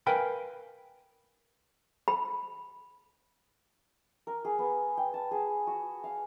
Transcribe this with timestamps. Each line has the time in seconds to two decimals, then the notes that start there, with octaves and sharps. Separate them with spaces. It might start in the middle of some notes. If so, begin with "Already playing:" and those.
0.07 A#4 B4 F5 G5 G#5 B5
2.08 B5
4.27 A#4
4.45 G#4
4.59 B3
4.97 G5
5.14 A5
5.31 G#4
5.67 F#4
6.04 F5